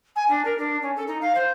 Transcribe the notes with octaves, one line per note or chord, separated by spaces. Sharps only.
G#5
D4
A#4
D4
C#4
A4
D#4
F5
C5